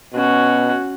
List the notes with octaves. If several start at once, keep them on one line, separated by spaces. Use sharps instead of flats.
B2 C#4 F#4